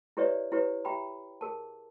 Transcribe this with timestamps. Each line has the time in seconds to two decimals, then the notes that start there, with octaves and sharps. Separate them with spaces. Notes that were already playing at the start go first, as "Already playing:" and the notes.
0.17 E4 G4 B4 C#5 D5 E5
0.52 E4 G4 B4 C#5
0.85 G4 E5 G5 A#5 B5
1.41 G#4 A#4 A5